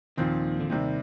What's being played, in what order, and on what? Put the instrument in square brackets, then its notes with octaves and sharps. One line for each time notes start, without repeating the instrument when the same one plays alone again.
[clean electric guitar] D#2 D#3 [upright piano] A#2 F3 C4
[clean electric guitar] D3
[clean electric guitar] D#2 D#3 [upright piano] C3 G3 C4